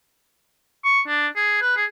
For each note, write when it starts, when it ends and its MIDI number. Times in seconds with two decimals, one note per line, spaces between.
0.85 1.01 85
1.08 1.27 62
1.36 1.60 68
1.61 1.74 71
1.77 1.85 68